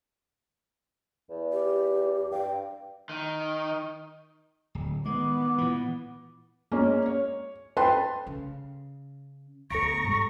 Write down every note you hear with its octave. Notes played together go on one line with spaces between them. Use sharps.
E2
G4
G2 G5
D#3
D1
D#3 G#3 B3 D6
A#2 E3
G#3 A#3 C#4
C#5
A4 B4 G5 A5 C6
C#3
D2 B3 A4 A#5 C#6 A#6 C#7 D7
G#2 G3